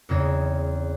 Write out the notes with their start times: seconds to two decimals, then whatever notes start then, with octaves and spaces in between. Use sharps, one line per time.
0.09 E2 C#3 C4 D#4 C#5 G#6